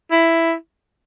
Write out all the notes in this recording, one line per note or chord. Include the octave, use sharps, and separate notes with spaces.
E4